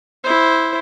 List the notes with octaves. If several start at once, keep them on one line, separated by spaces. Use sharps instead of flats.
E4 C5